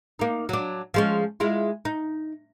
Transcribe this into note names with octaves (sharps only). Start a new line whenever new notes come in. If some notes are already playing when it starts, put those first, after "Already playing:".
A#3 D#4
F#3 D4
F3 G#3 C#4
G#3 E4 F4
D#4